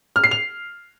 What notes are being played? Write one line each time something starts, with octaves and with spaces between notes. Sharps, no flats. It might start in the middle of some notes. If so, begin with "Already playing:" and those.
F6
C7
F7